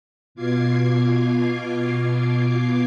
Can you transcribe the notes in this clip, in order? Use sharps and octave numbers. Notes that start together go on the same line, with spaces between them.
B2 F4 D6 G#6 C7